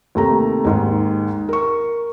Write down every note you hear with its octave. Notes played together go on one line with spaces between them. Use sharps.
D#2 C3 A3 G4 A#5
D#2 G#2
A#4 C#6